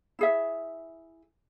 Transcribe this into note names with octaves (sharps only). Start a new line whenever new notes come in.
E4 G#4 E5